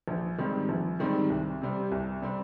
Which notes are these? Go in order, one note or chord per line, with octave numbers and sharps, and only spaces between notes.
A#1
G#2 D#3 G3 C4
A#1
G#2 D#3 G3 C4
C2
C3 G3 C4
C2
C3 G3 C4